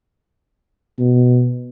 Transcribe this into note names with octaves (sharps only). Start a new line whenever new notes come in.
B2